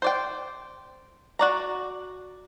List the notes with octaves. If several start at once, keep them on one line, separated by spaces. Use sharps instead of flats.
C5 D5 G5
F#4 D5 A#5